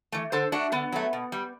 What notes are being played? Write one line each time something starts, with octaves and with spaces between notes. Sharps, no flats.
E3 A3
D3 A4 C5
A3 D4 F#4
D3 B3
F#3 A3
B2
G3